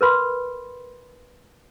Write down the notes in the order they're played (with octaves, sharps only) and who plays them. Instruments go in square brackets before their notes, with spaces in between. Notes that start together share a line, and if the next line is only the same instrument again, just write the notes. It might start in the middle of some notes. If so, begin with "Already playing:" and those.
[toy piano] A#4 B4 B5 C6